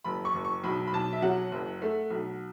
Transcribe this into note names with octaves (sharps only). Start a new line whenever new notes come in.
F#1 B5
C#6
F#1
C#6
B1 B5
B5
B1 A5
E5
F#3 F#5
F#1
A3
B1